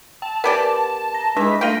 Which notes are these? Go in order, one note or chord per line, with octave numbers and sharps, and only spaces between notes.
G5 A5
B3 G4 A#4 B4 D5
A#5 A#6
E3 G3 G#3 D4 B6
A3 F4 G5 A#6 D7